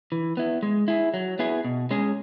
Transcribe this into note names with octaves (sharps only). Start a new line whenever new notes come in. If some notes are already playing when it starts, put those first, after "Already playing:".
E3
B3 E4
G#3
E4 G#4
F#3
B3 E4 G#4
B2
G#3 C#4 G#4